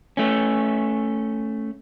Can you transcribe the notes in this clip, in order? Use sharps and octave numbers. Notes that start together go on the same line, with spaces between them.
A3 C#4